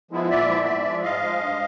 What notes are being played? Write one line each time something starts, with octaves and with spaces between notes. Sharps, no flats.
F3 G#3 B3 E4
A#2 D5 E5
F3 G#3 B3 E4
G#2
F3 G#3
G#2 D#5 F5
F3 G#3
G2